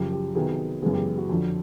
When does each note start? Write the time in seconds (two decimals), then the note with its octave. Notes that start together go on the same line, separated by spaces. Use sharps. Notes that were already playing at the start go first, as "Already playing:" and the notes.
Already playing: F#2 C#3 F3 G4
0.12 G4
0.35 C3 D#3 F#3 B3 G#4
0.82 F#2 C#3 E3 G#3 B3 G#4
0.94 G4
1.06 G4
1.18 F#4
1.30 F2 D3 F3